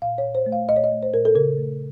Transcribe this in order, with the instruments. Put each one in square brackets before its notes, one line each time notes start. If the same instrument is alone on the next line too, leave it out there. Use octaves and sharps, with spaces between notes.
[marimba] A#2 F5
C#5
A#2
C5
A3
F5
A#2 D#5
C#5
D#5
A3
C5
A#2 A#4
A4
C#3 A#4
A3